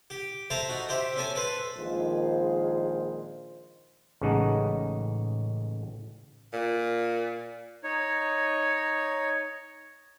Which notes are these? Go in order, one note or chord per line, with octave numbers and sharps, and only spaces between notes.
G4
A4 C5 E5 A5 A#5
D#4 F#4
G4 C5 E5
C#4 A4 G#5
A4 B4 C5
A#1 D#3 G#3 F4 C5
A1 C#3 G#3 D#4 F#5 A5
A#2
D#4 C#5